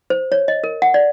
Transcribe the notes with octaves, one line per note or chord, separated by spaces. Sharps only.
C5
C#5
D#5
A#4
F#5
D5